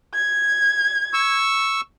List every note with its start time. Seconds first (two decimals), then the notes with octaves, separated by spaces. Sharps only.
0.14 G#6
1.13 C#6 E6